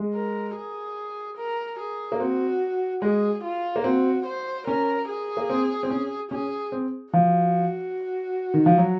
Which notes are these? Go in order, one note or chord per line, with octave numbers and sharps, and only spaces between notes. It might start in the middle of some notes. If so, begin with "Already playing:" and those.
Already playing: G#3
A#4
G#4
A#4
G#4
A#3
C4 F#4
G#3 G#4
F4
A#3
C4 F#4
C5
C#4 A#4
G#4
A#3
C4
C4
C#4
C#4 G#4
C4
F3 F#4
D#3
F3
F#3